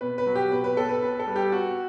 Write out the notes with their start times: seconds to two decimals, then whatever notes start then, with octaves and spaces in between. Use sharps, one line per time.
0.01 B2 B4
0.18 B4
0.26 F#3
0.35 G4
0.51 B2 B4
0.64 B4
0.77 B1 A4
0.89 B4
1.02 B3 B4
1.19 A4
1.27 G3
1.36 G4
1.52 B3 F#4